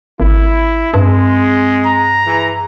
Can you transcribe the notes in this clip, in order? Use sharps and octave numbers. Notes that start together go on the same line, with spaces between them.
G#1 E4
G2 G#3 C4 G#4
A#5
E3 G#4